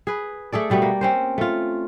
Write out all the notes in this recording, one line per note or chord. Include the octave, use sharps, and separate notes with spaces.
G#4 B4
A3 G#4 A4 D5
B2 G3 A3 B3
A#3
C4 C#4 C5
A3 F4